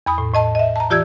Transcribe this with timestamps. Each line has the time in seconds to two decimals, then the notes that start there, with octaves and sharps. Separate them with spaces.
0.06 E2 B5 D#6
0.18 A2
0.33 A2 D#5 A5
0.55 D#5 E5
0.76 A5 A#5
0.90 E3 F4 G4 D5 E6 G#6